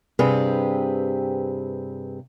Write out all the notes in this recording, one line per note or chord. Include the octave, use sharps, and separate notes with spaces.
G2 C3 C4 G4 G#4 B4